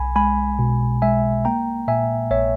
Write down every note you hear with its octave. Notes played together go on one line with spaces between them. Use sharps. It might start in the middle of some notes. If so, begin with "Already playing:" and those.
Already playing: B1 G#5 B5
G#3 G#5 B5
B2
G#3 E5 G#5
A#3 G5 A#5
A#2 E5 G#5
A#1 C#5 E5